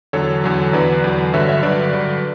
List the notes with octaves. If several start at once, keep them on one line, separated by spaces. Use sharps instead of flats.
E2 D3 F#3 A4 C#5
E2 D3 F#3
E2 D3 F#3 B4 D5
E2 D3 F#3
G2 D3 F#3 C#5 E5
C#5 E5
G2 D3 F#3 B4 D5
G2 D3 F#3